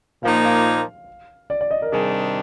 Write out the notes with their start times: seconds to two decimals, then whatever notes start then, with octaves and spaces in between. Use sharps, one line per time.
0.23 A#2 F3 A#3 D#4 F5
0.44 F5
1.50 D5
1.61 D5
1.71 D#5
1.82 A#4
1.92 C3 D#3 G3 D4 G#4